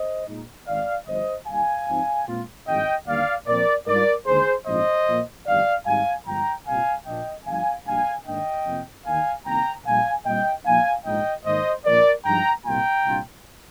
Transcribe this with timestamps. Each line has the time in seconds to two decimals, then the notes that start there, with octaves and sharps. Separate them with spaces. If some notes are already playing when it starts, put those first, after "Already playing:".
Already playing: C5 D#5
0.28 A#2 G#3 D#4
0.67 G#1 G#2 D#3 D5 F5
1.07 G1 G2 F3 C5 D#5
1.47 D#2 D#3 G3 F5 G#5
1.88 G#2 F3 C4 D#4
2.27 A#2 G#3 C4 F4
2.67 G#1 G2 F3 G#3 D#5 G5
3.07 D#2 D3 G3 A#3 D5 F5
3.47 A#2 F3 C4 A#4 D5
3.87 G#2 G3 D4 F4 A#4 D5
4.26 D#2 D3 G#3 G#4 C5
4.66 A#1 G#2 F3 C4 C5 D#5
5.06 A#2 F3 A#3
5.46 G1 F2 D#3 G3 D5 F5
5.86 G#1 G#2 G3 F5 G#5
6.26 G1 G2 F3 G#3 G5 A#5
6.66 C2 A#2 G3 C4 F4 F5 G#5
7.06 A#1 A#2 F3 A#3 D4 D#5 G5
7.46 G1 G2 D3 F3 F5 G#5
7.86 A#1 A#2 G3 D4 F5 G#5
8.26 G#2 D#3 A#3 D4 D#5 G5
8.65 F2 C3 F3 A#3
9.06 D#2 D#3 A#3 D#4 F5 G#5
9.45 C2 C3 D#3 A#3 G5 A#5
9.85 A#1 A#2 G3 F5 G#5
10.25 A#2 G3 C4 D#5 G5
10.66 A#2 F3 A#3 D#4 F5 G#5
11.05 A#1 G#2 F3 G#3 D#4 D#5 G5
11.45 G#2 D#3 A#3 D#4 C5 D#5
11.85 A#1 A#2 F3 A#4 D5
12.25 G2 F3 G#3 D#4 G5 A#5
12.65 C2 A#2 G3 A#3 F4 G5 A#5
13.05 C2 A#2 G3 D4 F4